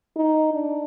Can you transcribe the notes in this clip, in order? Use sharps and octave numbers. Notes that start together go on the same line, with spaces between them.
D#4
D4